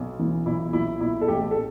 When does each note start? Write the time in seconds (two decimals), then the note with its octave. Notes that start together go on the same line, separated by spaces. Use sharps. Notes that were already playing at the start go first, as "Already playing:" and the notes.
Already playing: B1
0.19 E3
0.46 B1 E4
0.73 B1 E4
1.01 B1 E4
1.21 A4
1.28 A1 G4
1.51 A4